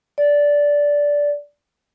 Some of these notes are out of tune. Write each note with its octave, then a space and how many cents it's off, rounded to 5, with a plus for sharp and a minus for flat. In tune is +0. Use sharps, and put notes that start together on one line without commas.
D5 -10